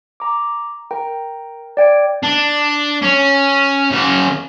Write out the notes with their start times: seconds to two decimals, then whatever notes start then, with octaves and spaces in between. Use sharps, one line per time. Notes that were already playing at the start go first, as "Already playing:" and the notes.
0.20 A#5 D6
0.91 A#4 G5 A#5
1.77 D5 G5 G#6 D7
2.23 D4
3.02 C#4
3.91 C#3 F#4